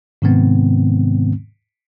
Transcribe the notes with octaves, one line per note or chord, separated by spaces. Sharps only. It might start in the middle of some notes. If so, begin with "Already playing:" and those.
G#2 C3 D#3 G#3 B3 C4